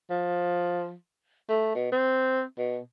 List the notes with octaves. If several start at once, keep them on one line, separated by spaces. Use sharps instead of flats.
F3
A3
B2
C4
B2